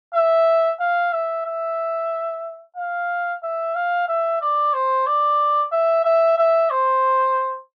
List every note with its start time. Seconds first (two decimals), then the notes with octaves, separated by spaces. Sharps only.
0.14 E5
0.80 F5
1.13 E5
1.46 E5
2.77 F5
3.43 E5
3.75 F5
4.08 E5
4.42 D5
4.74 C5
5.07 D5
5.72 E5
6.05 E5
6.38 E5
6.71 C5